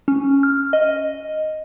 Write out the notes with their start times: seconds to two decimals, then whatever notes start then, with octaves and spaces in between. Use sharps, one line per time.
0.08 C#4
0.43 F6
0.73 D#5